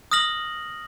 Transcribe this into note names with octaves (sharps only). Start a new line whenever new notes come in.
D#6 F6 A#6 F#7